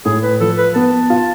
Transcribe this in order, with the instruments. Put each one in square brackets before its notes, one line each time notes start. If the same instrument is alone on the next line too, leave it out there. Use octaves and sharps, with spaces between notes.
[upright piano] A2 [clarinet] G#4
[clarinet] B4
[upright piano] F3 [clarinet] A4
[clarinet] B4
[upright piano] B3 [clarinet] A5
[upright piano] F4